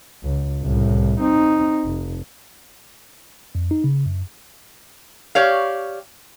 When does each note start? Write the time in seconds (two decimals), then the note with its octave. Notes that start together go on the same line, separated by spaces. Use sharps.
0.24 C#2
0.63 C2 A2
1.21 C4 D#4
1.85 F1
3.55 F2
3.71 D#4
3.84 C#3
4.06 F#2
5.35 G4 C#5 D5 F5